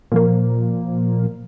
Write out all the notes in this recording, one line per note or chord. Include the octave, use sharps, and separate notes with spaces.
A#2 F3 A#3